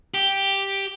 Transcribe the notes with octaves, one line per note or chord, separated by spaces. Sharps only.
G4